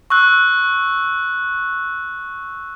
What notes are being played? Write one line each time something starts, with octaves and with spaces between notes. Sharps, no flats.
C#6 E6 F#6